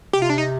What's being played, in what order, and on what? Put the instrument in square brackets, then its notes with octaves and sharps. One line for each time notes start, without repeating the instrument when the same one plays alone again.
[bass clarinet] C3 [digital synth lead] G4
[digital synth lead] F4
D4
D#4